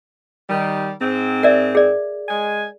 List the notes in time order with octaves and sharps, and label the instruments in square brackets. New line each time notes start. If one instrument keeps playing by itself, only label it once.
[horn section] D#3 G3
G#2 C4
[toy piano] A#4 D5 E5
G#4 D5
[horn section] G#3 G#5